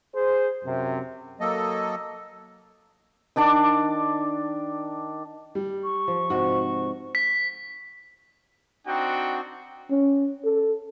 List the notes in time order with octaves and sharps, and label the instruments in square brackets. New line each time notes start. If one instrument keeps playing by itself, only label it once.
[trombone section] G#4 C5
F#2 C3
[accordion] F#3 A#3 A4 D#5
[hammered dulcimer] D#3 D4 D5 D6
[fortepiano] G3
[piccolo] C#6
[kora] F3
[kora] G#2 C3 F3 [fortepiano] F#4
[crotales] B6
[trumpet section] C4 D4 D#4 F#4 F#5 G5
[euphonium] C#4
A4